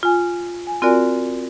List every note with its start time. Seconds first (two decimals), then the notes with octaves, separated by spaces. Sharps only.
0.03 F4 G#5
0.67 G#5
0.82 C4 F4 F#4 A#4 D5 G#5